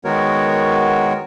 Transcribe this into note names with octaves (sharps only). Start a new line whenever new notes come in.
D#3 G#3 B3 F#4 A#4 C#5